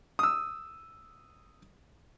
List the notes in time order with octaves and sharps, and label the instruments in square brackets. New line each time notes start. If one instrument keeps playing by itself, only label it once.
[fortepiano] D#6 E6